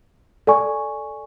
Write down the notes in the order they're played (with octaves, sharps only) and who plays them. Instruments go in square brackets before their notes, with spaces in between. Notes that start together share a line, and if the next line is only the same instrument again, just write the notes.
[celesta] A4 D5 G#5 C#6